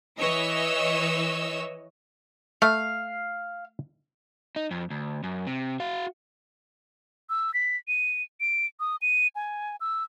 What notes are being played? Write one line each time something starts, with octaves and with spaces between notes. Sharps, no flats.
E3 C#5 D#5 E6
A3 F5
D#4
F2
D2
F#2
C3
F#4 F5
E6
B6
D#7
D7
D#6
D#7
G#5
E6